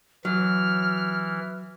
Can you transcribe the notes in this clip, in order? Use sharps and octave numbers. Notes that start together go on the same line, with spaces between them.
E3 F#3 F6